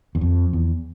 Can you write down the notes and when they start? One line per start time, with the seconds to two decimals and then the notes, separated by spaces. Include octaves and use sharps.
0.15 E2
0.21 F2
0.53 E2